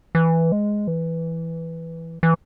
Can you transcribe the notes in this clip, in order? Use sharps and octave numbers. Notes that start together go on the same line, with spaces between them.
E3
G#3
E3
E3